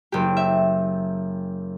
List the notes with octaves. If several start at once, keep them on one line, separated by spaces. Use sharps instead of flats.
F#1 G4
E5